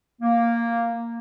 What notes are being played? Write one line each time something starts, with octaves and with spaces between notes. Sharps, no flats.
A#3